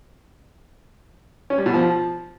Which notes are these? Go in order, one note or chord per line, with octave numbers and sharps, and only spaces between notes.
C#4
G3
B2
F3